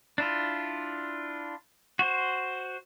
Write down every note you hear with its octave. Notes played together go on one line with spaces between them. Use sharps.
D4 E4 F4
F#4 C5